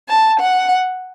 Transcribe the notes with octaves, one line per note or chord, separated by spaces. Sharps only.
A5
F#5